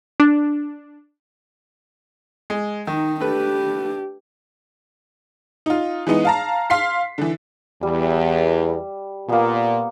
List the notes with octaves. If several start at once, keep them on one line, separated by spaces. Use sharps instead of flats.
D4
G#3
D#3 D#4
A3 D4 G4 B4
D#4 F4
E3 G#3 B3 D#4
F5 A5 A#5
F5 C6 B6 C7
D3 E3
E2 G3
A#2 A#3 B3